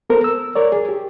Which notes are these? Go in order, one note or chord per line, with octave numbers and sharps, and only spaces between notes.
B3 A4 A#4 C5
E6
A#4 C#5 D5
G#4
G4